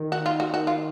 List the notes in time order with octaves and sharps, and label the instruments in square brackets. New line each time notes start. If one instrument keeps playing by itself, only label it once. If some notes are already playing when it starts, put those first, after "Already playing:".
Already playing: [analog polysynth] D#3
[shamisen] F#4
F4
F#4
F#4
F4